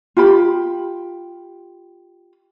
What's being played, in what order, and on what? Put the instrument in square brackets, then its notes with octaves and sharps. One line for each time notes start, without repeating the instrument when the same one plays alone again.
[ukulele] F4 G4 B5